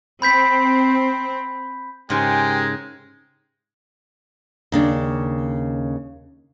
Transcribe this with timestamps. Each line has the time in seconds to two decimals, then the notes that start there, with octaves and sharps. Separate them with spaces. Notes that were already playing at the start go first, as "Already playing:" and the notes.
0.22 C4 B5 G6 B6
2.10 G#2 C#3 G#3 G4 A#4 G5 G#5 C6
4.72 D#2 C#3 D4